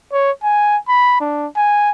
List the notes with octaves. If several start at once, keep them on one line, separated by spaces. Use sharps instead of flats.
C#5
G#5
B5
D4
G#5